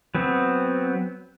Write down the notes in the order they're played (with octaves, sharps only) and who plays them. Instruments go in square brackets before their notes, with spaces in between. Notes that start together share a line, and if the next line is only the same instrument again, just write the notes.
[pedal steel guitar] F#3 B3 C4